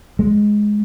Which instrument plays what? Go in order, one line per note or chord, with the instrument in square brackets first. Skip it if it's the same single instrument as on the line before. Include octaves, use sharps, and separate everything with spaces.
[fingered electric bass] G#3